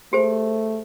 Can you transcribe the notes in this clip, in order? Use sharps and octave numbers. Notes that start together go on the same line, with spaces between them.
A3 G4 G#4 C5